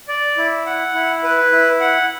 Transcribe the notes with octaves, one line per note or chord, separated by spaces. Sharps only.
D5
E4
F#5
E4
B4
E4
F#5